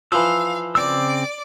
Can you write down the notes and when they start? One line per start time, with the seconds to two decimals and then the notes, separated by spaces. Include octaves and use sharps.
0.12 E3 F3 F5 E6
0.75 C#3 C4 D5 D6 E6